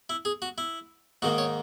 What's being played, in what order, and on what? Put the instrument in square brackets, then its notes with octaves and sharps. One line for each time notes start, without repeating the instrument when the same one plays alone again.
[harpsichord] E4
G#4
F#4
E4
G#2 D#3 A#3 F#4
C#5